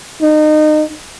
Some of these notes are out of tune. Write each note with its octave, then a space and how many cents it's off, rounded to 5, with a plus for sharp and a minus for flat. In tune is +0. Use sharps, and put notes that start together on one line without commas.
D#4 -25